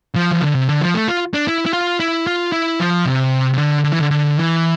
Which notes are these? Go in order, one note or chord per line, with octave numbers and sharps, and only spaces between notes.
F3
E3
D3
C3
D3
F3
A3
F4
D4
E4
E4
F4
E4
F4
E4
F3
C3
C3
D3
D3
E3
D3
D3
E3